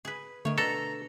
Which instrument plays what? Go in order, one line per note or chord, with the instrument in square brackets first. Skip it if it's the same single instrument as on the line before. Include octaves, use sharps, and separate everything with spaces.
[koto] G#4 B4
[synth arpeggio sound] D3 A3 [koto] D#3 C#5
[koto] B2 D4 A5 [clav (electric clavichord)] A4 [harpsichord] A#5